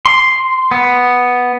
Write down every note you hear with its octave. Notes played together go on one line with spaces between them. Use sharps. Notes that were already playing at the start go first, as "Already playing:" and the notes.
C6
B3